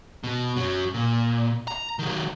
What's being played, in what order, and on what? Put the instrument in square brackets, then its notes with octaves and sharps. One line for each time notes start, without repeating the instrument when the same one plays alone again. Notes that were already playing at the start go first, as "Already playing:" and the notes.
[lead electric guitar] B2
F#2 F#3
A#2
A#5
D#3 F#3